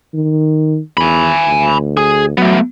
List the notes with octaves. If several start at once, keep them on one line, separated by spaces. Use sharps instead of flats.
D#3
E2 G#5 B5
D2
G#4
F#3 A3 B3